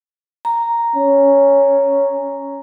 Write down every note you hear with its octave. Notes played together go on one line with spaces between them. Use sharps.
A#5
C#4